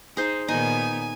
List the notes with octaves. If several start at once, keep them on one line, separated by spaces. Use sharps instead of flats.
D#4 G#4 C5
A#2 D#3 B3 D#4 G#5